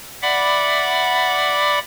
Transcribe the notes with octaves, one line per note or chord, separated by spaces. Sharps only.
D5 E5 F#5 B5 D6